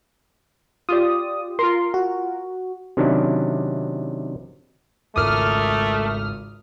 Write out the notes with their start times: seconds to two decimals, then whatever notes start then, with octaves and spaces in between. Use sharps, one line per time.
0.89 F4 G4 D5 D#6
1.59 F4 A#4 C6
1.94 F#4
2.97 C3 D#3 F#3 C#4 D4 E4
5.16 G#1 C#2 A3 A#4 D6 D#6 F6